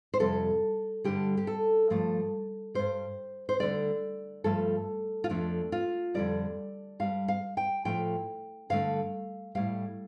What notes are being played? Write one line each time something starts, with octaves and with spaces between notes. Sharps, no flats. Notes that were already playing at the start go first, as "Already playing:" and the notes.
C5
F2 C3 G3 A4
G2 D3 G3 G4
G4
A4
G2 F3 A3
G2 G3 C5
C5
D2 D3 G3 D5
G2 F3 A3 A4
F4
F2 F3 A3 D4
F4
F2 D3 G3 D5
G2 G3 F5
F5
G5
A2 F3 A3 G5
G2 D3 A3 F5
A2 G3 F5